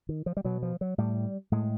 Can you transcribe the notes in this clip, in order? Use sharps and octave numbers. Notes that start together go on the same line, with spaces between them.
D#3
F3
G3
B2 F#3
F3
F#3
A2 G3
A2 G#3